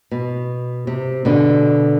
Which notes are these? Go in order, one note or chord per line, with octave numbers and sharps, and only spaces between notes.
B2
C3
B2 D3